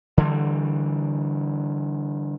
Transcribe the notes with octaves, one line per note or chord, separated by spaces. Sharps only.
D3 E3 G3